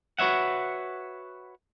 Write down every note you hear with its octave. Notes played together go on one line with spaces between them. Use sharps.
F#4 B4 C#5 E5 F#5